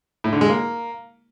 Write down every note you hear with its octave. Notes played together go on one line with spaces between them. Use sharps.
A2
D3
G#3
A#3